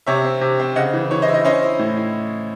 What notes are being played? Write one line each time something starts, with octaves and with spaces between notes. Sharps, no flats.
C3 C#5 E5
C4
C3
C4
C#3 D#5 F#5
E3
E3 C#5
C5 D#5
E4
C5 D#5
C#4 C5 D#5
E4
A2
E4